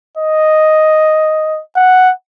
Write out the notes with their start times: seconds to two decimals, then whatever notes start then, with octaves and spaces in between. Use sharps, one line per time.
0.17 D#5
1.76 F#5